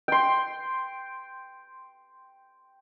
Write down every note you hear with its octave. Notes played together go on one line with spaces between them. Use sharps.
G5 C6